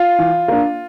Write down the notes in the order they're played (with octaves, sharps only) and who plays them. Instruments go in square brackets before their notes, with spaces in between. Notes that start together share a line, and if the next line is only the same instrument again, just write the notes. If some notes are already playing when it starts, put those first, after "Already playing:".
Already playing: [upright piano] F4
E3
A#3 D4